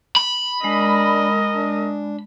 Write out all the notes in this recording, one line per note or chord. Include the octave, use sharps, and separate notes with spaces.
B5
G#3 D4 A#4 D5 D#5
D4